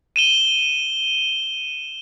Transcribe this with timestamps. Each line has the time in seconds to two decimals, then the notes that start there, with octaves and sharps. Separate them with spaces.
0.16 D#7 E7 G7